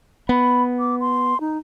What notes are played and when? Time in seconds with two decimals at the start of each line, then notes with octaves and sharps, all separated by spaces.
0.29 B3 B5
0.79 D6
1.01 C6
1.41 D#4